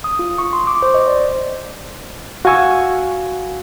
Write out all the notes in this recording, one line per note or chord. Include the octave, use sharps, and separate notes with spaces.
D#6
F4
C#6
C6
D6
C5
D#5
D5
F#4 F5 F#5 G#5 C#6 E6